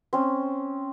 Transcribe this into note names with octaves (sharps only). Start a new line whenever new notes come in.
C4 C#4